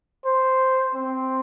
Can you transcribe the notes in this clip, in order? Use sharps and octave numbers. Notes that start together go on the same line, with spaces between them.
C5
C4